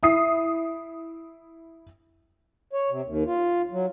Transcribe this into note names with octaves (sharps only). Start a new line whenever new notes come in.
E4 D#6 C7
C#5
C3
D#2
F4
F#3